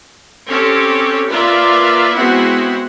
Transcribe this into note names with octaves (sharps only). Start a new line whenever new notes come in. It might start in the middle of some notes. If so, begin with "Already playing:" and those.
C4 C#4 G4 A4 C#5
A#3 F4 B4 D5 E5
G#3 B3 C4 E4 F#4 F#5